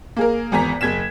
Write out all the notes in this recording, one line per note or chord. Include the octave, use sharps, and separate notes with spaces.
A#3 G#4 A#4
G#1 E2 G#5 A#5 B6
F#1 G#6 B6 E7